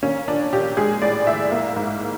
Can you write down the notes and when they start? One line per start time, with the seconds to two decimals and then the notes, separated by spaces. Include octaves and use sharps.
0.03 A#3 C#4
0.27 A#2 D4
0.53 A#2 G4
0.77 G#3 G#4
1.02 A2 D5
1.27 A2 E5
1.51 A#3
1.76 G#2